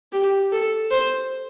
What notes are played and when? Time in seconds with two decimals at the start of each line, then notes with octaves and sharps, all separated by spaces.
0.12 G4
0.52 A4
0.91 C5